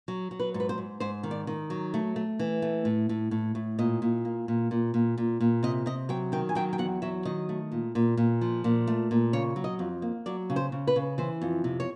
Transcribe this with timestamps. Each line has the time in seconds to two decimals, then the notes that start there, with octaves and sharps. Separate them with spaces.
0.08 F#3
0.31 F#3
0.40 B4
0.54 G#2
0.60 B4
0.69 C5
0.78 G#2
1.00 G#2 C5
1.23 D#3
1.31 D5
1.47 D#3
1.70 F#3
1.94 A3
2.16 A3
2.39 E3
2.62 A3
2.85 A2
3.09 A2
3.31 A2
3.55 A2
3.79 A#2 D#5
4.02 A#2
4.25 A#3
4.48 A#2
4.71 A#2
4.94 A#2
5.18 A#2
5.41 A#2
5.63 C3 D#5
5.86 C3 D#5
6.09 F#3 G5
6.32 D#3 G5
6.49 G#5
6.55 F#3 G5
6.73 G5
6.78 E2 F#5
7.02 F#3 E5
7.25 D#3 D#5
7.49 A3
7.72 A#2
7.95 A#2
8.17 A#2
8.41 F3
8.64 A#2
8.87 A3
9.11 A#2
9.33 C#3 C#5
9.56 F#3
9.64 D#5
9.79 F2
10.02 A#3
10.26 F#3 D5
10.50 C#3
10.56 C5
10.72 C#3
10.87 B4
10.96 C#3
11.18 E3 C5
11.42 F2
11.64 C3
11.80 C#5